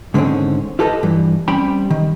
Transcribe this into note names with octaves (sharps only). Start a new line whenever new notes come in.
G#2 D3 D#3 A3 C4 C#4
F4 G4 A4 B4 D5 D#5
G2 E3
G3 C4 C#4 G5 B5
D#3